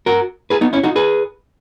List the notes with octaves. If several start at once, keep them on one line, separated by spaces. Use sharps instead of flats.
F#4 A#4
G#4 B4
B3 D#4
C#4 E4
D#4 F#4
G#4 B4